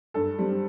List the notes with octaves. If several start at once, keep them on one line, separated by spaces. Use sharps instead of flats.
G2 A4
G3 C4